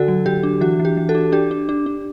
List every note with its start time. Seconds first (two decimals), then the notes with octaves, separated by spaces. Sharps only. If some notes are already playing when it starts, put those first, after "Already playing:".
Already playing: D3 F#4 A4
0.08 F#3
0.26 D3 G4
0.43 D4
0.61 E3 F#4
0.80 E3
0.85 G4
0.97 E3
1.09 F#4 A4
1.15 D4
1.32 D4 G4
1.51 D4
1.69 D4
1.86 D4